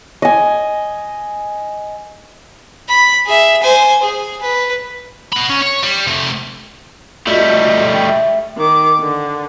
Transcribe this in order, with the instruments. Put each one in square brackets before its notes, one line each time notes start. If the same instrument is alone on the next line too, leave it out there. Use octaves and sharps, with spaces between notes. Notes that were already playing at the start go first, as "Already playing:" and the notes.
[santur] D#5 G#5
[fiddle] B5
G#4 E5
C5 G#5
G#4
B4
[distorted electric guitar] F#4 B5
C#4
C#5
G3
C3 A3
[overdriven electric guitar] G3 A3 [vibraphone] F4 F#4 D#5
[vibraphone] G5 C#6
E5
[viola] D#3 D6
D3